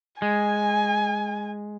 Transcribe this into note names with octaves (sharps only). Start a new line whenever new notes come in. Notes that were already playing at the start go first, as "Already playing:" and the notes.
G#3 G#5